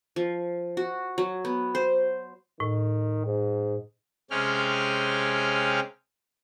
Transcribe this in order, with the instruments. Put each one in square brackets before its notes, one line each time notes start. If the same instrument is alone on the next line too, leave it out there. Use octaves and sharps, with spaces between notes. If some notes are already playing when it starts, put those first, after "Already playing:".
[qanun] F3
F#4
F#3
B3
C5
[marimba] A2 [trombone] D#3
[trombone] G#2
[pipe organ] C3 G#3 C#4 G5 F6